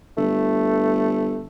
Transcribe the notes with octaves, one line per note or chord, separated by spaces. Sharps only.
G1 A3